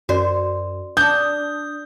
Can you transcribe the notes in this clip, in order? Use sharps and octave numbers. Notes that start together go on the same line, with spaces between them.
F#2 F#4 C5 D5
D4 D#6 G6